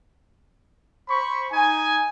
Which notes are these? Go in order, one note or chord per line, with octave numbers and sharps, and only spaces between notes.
C5 B5 C#6
D#4 G#5